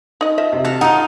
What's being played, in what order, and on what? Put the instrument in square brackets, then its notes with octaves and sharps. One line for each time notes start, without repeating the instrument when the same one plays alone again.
[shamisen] D#4 D#5
F3 D#5 E5
[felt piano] C3
[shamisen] F#4 [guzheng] A4 F5
[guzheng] D#4 F4 [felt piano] F#5 A#5 D#6